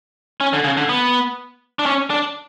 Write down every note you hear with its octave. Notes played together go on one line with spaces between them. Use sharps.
C#4
D3
C#3
D3
B3
D4
C#4
D4